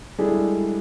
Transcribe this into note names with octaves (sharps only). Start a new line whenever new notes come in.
G3 G#3 D4 E4 G#4 A4